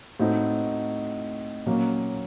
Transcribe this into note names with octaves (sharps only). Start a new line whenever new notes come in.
A2 A3 C4 D#4 F#4
A#2 F#3 A#3 C#4